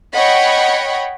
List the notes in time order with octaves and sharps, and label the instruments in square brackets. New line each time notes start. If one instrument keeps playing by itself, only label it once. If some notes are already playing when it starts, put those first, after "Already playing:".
[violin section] C#5 D#5 F#5 G5 B5 C#6